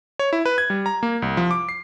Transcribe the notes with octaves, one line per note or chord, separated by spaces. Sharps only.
C#5
E4
B4
G#6
G3
A#5
A#3
C2
F3
D6
C7